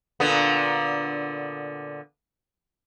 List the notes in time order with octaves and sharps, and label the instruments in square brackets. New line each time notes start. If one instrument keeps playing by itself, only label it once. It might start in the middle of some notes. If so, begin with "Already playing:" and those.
[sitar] A#2 D3 B3